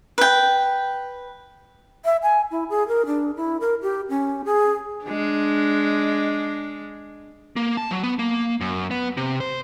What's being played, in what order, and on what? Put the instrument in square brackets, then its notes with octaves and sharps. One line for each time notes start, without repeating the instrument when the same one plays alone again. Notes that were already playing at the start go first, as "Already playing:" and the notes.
[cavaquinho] B4 G5
[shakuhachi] E5
G#5
E4
G#4
A#4
D4
E4
A#4
G4
C#4
G#4
[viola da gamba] G#3 D4
[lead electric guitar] A#3
A5
F#3
B3
A#3
F#2
B3
C3
C5